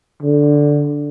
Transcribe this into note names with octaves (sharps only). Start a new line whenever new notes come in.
D3